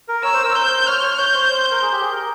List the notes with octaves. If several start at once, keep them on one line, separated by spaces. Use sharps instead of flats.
A#4
C#5 E6
C5
A#4
C5 G6
C#5 F6
C#5
C#5 G6
C5
A#4
G#4
G4
G#4
A#4